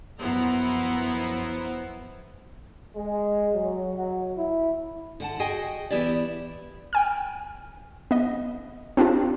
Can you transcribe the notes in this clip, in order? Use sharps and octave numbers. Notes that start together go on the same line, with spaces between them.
F#2 F3 B3 E4 C5 A#5
G#3
F#3
F#3
E4
D3 F#5 A5
F#4 G#4 D#5 G5 G#5
E3 B3 E4 G4 D5
G5 G#5 F6
B3 D#5
C4 D4 D#4 F4 G4